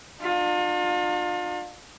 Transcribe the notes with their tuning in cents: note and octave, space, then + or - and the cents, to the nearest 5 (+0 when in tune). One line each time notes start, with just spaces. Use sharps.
D4 +45 F4 +35